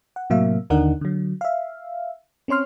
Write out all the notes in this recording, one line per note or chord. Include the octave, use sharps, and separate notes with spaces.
F#5
A2 C3 F#3 A#3 E5 F5
D#2 D3 D4 D#4 A#4 F#5
D3 F#3
E5 F5
C4 C#4 C#5 C6 F6